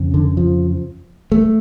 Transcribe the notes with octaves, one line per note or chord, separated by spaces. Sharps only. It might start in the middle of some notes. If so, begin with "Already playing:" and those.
Already playing: F2 C#3
D3
F3
A3